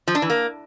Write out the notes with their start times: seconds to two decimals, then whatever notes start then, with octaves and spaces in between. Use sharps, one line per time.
0.08 F3
0.15 D4
0.22 E3
0.30 A#3